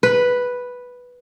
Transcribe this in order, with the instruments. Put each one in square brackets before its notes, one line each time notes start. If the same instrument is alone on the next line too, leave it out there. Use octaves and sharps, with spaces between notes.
[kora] B4